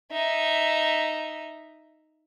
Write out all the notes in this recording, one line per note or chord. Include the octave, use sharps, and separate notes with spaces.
D#4 E5